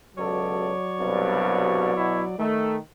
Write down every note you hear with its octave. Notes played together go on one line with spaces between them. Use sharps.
C#2 B2 F#3 A4 C#5 D5
C2 G2 B2
B2 E4
D#3 A3